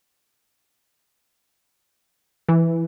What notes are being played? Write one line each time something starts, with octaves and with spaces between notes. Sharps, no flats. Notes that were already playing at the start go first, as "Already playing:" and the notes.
E3